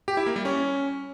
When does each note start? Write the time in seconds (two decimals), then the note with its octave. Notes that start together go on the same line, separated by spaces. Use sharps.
0.08 G4
0.17 E4
0.26 A#3
0.36 G3
0.45 C#4